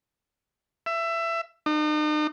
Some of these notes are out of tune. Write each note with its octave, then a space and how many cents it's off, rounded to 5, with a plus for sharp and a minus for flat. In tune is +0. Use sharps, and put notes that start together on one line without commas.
E5 +20
D#4 -40